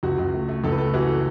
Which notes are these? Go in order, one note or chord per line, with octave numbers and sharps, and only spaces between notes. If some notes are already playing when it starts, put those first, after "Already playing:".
C#2 F#4
C#2
A3
A3
C#2 A4
B4
A3 A4
E3 F#4
A4